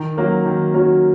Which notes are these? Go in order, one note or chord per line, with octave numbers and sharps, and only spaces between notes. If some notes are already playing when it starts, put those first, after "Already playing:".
Already playing: D#3
F#3 A#3 C#4 F#4
D#3
F#3 A#3 C#4 F#4